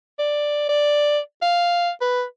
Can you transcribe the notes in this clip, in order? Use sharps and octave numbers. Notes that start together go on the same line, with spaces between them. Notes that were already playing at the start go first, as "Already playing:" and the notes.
D5
D5
F5
B4